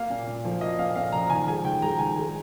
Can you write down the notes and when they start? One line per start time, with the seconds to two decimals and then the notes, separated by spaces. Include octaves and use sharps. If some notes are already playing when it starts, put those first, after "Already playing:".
Already playing: A#3 F5
0.10 A#2
0.27 A#2
0.45 F3
0.61 A#3 D#5
0.79 A#2 F5
0.96 A#2 F5
1.12 F3 A#5
1.30 D#3 G#5
1.47 G#3 G#5
1.64 D#3 G5
1.81 G#3 A#5
1.99 D#3 G#5
2.16 G#3